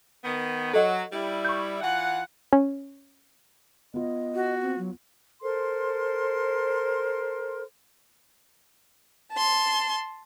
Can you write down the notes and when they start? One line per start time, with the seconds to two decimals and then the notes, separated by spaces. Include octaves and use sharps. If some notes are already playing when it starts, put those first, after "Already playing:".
0.24 D#3 B3
0.74 F#3 A4 D#5 F#5
1.12 G3 E4
1.45 C#6 G6
1.82 E3 F4 F#5
2.53 C#4
3.94 B3 F4 D#5
4.35 F#4
4.63 C4
4.79 F#3
5.42 A4 A#4 C5 C6
9.33 A5 C6